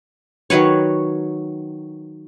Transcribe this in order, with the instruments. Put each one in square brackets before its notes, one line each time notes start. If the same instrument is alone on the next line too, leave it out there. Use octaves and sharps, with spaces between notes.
[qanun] D#3 F#3 B4 C#5